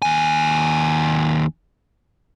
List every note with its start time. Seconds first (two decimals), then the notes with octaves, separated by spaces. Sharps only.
0.02 D#2 G#5